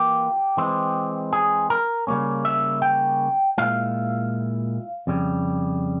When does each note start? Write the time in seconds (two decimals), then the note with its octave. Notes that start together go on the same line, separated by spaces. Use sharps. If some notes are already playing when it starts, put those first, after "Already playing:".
Already playing: E3 A#3 F4 G4
0.57 E3 G#3 C4
1.33 G#4
1.70 A#4
2.07 C#3 G3 A#3 C#4
2.45 E5
2.82 G5
3.58 A#2 G#3 E4 F5
5.07 F2 C#3 G3